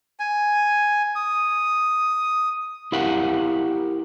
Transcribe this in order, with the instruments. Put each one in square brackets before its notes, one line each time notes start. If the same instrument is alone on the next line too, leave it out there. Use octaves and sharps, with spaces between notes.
[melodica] G#5
D#6
[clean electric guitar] E4 G4 A#4 F5 F#5